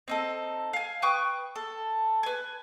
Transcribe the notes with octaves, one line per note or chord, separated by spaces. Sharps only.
C4 D#4 A4
F5 G#5
B4 G5 C#6 D#6
A4
B4 G#5